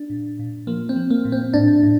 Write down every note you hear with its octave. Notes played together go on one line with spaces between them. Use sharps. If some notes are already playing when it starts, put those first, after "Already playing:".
Already playing: D4
A#2
A#2
F3 A#3
C4
F3
A#3
A#2
C4
A2 D4
A2